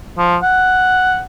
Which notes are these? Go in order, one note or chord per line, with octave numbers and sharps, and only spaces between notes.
F3
F#5